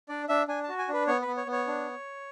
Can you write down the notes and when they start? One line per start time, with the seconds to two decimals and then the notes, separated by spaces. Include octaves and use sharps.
0.09 D4 D5
0.29 D4 E5
0.48 D4 G#5
0.63 A5
0.69 F#4
0.78 G#5
0.88 D4 B4
1.07 B3 C#5
1.22 B4
1.27 B3
1.37 C#5
1.47 B3
1.52 C#5
1.67 D4